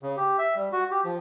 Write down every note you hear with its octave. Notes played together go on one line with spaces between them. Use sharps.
C#3
G4
E5
G3
F#4
G4
F3